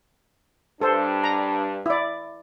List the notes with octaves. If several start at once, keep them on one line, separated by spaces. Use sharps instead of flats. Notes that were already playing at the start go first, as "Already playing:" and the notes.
G2 D4 A4 C5
A#5
E4 D5